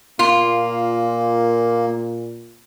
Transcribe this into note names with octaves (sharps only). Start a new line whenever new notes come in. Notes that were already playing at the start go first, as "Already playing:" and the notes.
A#2 A#3 F4